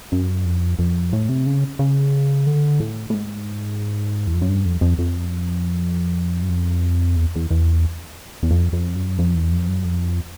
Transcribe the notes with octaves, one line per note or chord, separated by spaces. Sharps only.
F#2
F2
F2
A2
C3
C#3
C#3
D3
A2
A2
G#2
E2
F2
F#2
G2
F2
F2
F2
F#2
F2
E2
E2
E2
E2
F2
F2
F#2
F2
E2
F2
F#2
F2